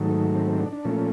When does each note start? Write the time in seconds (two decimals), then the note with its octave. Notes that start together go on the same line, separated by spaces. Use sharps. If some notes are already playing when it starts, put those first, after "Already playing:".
Already playing: G#2 D#3 F#3 A3
0.35 C4
0.47 C4
0.59 D4
0.73 D4
0.85 A#2 F3 A3 C#4